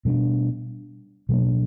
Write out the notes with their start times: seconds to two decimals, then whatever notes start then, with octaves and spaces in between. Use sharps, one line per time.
0.05 B2 G3 A#3 D4
1.29 B2 F#3 A#3 D4